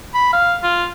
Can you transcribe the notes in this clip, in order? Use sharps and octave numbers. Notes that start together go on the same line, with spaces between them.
B5
F5
F4